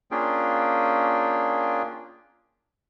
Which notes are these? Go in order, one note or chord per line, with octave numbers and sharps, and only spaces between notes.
A#3 C#4 D4 F4 G#4 G5